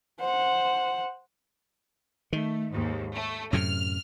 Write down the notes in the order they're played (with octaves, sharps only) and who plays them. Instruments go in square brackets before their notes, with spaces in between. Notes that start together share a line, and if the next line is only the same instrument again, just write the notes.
[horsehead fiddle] C5 F#5
[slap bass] D#3 [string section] A3
[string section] D#2 G#2
A3
[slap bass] F#2 A2 C3 [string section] F6